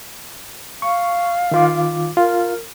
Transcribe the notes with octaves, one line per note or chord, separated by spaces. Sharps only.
F5 C#6
D#3 F4 D6
F4 A#4